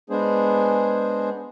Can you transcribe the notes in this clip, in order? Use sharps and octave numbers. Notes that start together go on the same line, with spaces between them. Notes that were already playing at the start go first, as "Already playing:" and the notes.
G#3 B3 D4 G#4 C5